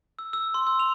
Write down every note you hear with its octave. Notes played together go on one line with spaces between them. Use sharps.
E6
E6
C6
E6
F7